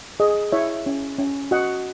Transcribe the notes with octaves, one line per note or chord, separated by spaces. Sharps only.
G#4 D#5
E4 C#5 E5
C#4
C#4
F#4 D#5 F#5